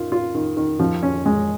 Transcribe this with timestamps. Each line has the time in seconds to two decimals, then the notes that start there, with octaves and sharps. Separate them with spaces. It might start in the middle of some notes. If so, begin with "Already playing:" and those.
Already playing: D#3 F4
0.12 F4
0.35 D#3
0.57 D#3
0.80 F3
1.03 C#4
1.26 G#3